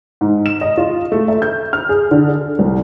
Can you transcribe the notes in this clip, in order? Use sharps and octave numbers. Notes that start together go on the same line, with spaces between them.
G#2
E7
D#5
F4
A3
E5
G6
F6
G#4
D3
A4
C2